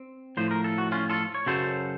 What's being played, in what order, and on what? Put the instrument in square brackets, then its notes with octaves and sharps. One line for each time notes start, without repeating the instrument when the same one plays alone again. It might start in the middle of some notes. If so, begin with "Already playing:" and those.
Already playing: [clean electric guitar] C4
A2 F3 C5
A#4
A4
F#4
C#4 F4
F4 A4
C#5
F#2 C#3 F#3 A4 C5